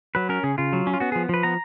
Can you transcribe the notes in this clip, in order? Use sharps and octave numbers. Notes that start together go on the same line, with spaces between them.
F#3 B4
C#4 A#4
C#3 G#4
C#3 F4
F#3
C#4
F4
B3 F#4
F3 G#4
F3 B4
B3 A#5